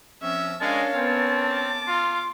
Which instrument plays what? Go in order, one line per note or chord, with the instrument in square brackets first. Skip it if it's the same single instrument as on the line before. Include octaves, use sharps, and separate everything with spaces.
[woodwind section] F3 C4 C#4 [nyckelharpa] E5
[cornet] G#3 [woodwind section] C#4 A#4 C#5 [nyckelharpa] D4 F5 [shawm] A5
[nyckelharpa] B3 [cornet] C4
[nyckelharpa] D6
[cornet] F4 [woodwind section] C6